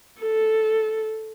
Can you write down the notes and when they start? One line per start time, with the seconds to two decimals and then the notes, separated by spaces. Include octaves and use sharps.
0.22 A4